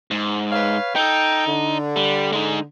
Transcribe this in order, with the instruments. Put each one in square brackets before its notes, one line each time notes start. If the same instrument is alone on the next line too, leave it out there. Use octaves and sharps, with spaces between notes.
[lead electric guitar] G#2
[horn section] B4 C#5 F5
[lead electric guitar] D#4 [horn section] A4 G5
[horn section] D3
[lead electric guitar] G3
G#3 D#4